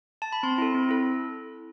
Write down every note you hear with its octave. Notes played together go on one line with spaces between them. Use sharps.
A5
B5
C4 C6
E4 A4
C4
E4 A4